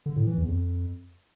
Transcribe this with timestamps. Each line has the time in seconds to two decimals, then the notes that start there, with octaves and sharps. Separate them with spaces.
0.06 D3
0.16 A2
0.27 E3
0.38 E2
0.48 F2